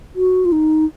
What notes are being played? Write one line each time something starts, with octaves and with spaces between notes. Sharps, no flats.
F#4
F4
D#4